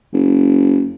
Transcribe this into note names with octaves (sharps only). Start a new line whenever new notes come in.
F#1